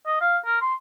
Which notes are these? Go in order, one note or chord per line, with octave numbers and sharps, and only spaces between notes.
D#5
F5
A#4
C6